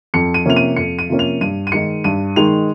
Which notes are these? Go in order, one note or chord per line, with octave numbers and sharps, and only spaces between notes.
F2 C#7
D#7
C3 F3 A#3 C#4 F7
D#7
F2 C#7
D#7
C3 F3 A#3 C#4
F7
G2 D#7
D#7
D#3 G#3 D#4 C#7
G2 D#7
D#3 G#3 D#4 F7